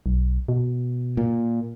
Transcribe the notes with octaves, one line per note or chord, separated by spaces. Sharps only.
B1
B2
A#2